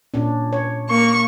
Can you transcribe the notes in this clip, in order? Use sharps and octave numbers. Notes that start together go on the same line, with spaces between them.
A#2 C#4 D4
C#5
A#3 C#6